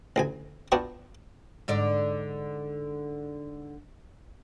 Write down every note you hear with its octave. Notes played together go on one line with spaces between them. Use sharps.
A1 D2 G#5
B3 D4 F4 F#4 G5
G#2 D3 D5